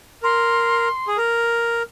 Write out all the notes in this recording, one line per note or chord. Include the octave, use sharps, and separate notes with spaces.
A#4 C6
G#4
A#4